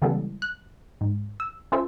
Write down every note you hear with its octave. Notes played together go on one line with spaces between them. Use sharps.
C#3 E3 G3 G#3 B3 A4
F#6
G#2
E6
C#4 F4 A4 C5 E5